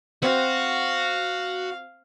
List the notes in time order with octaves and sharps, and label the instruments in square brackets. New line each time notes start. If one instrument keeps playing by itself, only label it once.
[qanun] C4 [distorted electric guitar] F#4 [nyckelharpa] F5